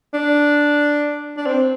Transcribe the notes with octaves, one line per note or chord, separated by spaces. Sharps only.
D4
D4
C4